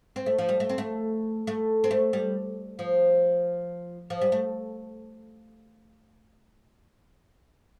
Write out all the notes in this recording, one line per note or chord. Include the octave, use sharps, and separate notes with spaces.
C4
A3
F3
G3
A3
C4
A3
A3
C4
A3
G3
F3
F3
G3
A3